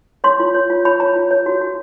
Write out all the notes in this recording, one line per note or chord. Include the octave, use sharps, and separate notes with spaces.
C#5 C6
F4
C#5
F4
C#5 B5
C#5 A#5
F4
C#5
F#4
F#4